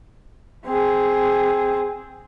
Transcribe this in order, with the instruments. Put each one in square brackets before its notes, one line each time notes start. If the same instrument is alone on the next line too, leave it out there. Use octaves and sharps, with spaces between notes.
[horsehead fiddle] C4 G#4